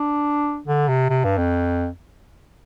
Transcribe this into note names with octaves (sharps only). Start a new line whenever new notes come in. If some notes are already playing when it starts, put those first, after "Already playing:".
Already playing: D4
D3
C3
C3
G2
F2